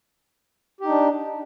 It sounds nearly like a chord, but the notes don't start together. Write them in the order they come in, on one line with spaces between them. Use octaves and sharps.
G4 D#4 D4